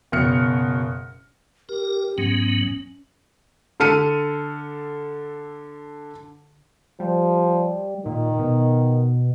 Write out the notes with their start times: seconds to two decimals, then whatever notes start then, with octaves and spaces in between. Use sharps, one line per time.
0.12 F#1 B2 F6 C#7
1.69 G4 A#4
2.18 G#2 F#3 B3 C#4
3.80 D3 A4 F6 C#7 D#7
7.00 F3 G3
8.06 A#2 D#3
8.39 B2